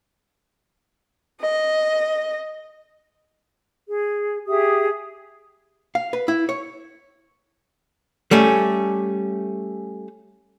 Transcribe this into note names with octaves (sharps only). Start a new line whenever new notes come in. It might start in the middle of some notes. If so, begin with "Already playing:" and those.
D#5
G#4
G4 G#4 E5 D#6
F5
B4
E4
C#5
G3 A3 C#4